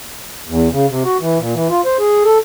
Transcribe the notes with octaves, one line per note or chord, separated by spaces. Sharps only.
E2
C#3
C3
F#4
E3
A#2
E3
F4
C5
G#4
A4